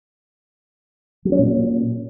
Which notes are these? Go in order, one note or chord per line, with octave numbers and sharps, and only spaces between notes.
F#3
C#4
A#2